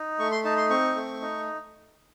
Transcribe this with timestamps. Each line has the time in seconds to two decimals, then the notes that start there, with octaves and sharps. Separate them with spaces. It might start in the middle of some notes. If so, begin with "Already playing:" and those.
Already playing: D#4
0.19 A3 C#6
0.32 C6
0.45 D#4 A5
0.57 C6
0.70 C4 C#6
0.96 A3
1.21 D#4